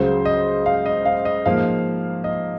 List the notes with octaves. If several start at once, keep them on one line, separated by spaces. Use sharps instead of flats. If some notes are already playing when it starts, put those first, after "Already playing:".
Already playing: C#2 C#3 F#3 C5
D#5
F5
D#5
F5
D#5
G#2 F3 A#3 F5
D#5